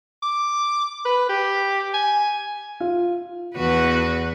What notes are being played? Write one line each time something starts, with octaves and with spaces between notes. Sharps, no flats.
D6
B4
G4
G#5
F4
E2 F#4 B4